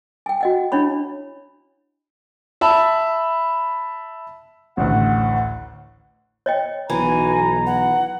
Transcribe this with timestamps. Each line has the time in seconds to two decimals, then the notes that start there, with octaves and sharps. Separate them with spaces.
0.26 G5 G#5
0.41 F#4 D#5 F#5
0.72 D4 E4 C#5 B5
2.61 E5 A5 B5
4.77 A1 D2 F#5
6.46 C#5 D#5 G5
6.90 B1 E3 G#5 A#5
7.66 F#5